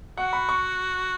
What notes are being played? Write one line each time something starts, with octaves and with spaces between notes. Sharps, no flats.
F#4 F#5
B5
C#6